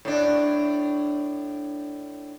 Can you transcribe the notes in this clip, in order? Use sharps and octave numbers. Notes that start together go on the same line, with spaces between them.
A2 D4